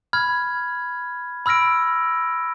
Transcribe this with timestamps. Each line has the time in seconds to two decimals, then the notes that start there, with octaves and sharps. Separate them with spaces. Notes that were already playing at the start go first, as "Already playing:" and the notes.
0.13 B5 F6 G#6
1.46 B5 E6 F6 A#6 D7